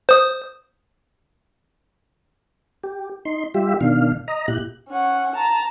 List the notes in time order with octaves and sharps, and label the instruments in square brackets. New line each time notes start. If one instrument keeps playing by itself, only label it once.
[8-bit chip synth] C5 D#6
[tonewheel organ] G4
D#4 C6
G3 F4 G4 E5
B2 D#3 D4 F5
D#5 A#5
A#2 E4 G4 F#6
[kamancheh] C#4 F#5
A5 A#5